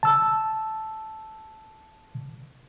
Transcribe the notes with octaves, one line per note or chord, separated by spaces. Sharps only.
A5 E6